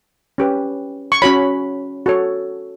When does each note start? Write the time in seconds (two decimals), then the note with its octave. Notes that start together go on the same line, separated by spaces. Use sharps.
0.38 C#4 G4 B4
1.12 C#6
1.22 C#4 F#4 C#5 B5
2.06 F#4 A4 C#5